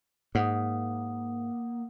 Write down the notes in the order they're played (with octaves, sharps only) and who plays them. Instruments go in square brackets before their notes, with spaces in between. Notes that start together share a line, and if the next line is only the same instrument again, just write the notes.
[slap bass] G#2 [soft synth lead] A#3 [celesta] F#5 D#6